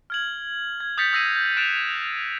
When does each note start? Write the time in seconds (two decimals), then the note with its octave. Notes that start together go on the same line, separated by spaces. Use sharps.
0.10 F6 G#6 F#7
0.80 G#6
0.98 D#6 G6 A6 B6 C#7
1.13 D#6 E6 A#6 C7 D#7
1.36 G6
1.57 F#6 A6 D7 E7 F7